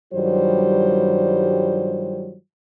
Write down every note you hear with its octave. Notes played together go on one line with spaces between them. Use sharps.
G2 D#3 F#3 G3 F4 C5